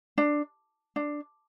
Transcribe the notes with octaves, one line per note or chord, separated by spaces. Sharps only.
D4
D4